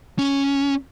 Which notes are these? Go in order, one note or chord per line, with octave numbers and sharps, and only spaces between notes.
C#4